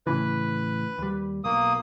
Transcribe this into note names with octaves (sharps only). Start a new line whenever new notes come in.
A2 C#3 E3 B4
D#2 G3
B1 A#3 D#6